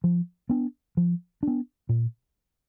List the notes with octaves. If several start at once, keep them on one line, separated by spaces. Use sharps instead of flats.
F3
B3 D4
F3
B3 D4
A#2